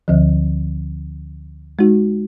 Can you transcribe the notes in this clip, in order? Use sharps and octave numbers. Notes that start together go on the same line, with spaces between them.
D2 D3 F3
G#3 D#4 F#4